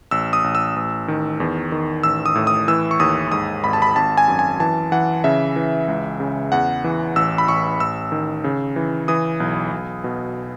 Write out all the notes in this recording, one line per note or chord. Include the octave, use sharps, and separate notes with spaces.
A1 E6
D#6
A1
E6
A1
D#3
E2
D#3
A1 E6
D#6
A2
D#6
E3 E6
C#6
D#2 D#6
G#2 D#6
G#1 B5
A5
B5
G#1 A5
G#5
F#2
G#5
E3 A5
E3 F#5
C#3 E5
E3
C#2
C#3
E2 F#5
E3
A1 E6
B5
A1 C#6
A1 E6
D#3
C#3
E3
E3 D#6
B1
B1
B2